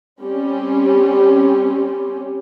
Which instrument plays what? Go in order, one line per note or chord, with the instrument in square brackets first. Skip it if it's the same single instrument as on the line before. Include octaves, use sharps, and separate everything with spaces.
[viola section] G3 C4 C#4 G4